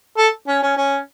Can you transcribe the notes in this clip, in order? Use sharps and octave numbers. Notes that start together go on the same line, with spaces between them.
A4
C#4
C#4
C#4